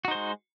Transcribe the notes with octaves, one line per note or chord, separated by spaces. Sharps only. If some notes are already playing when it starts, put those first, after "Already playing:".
G#3 D#4 F#4 C5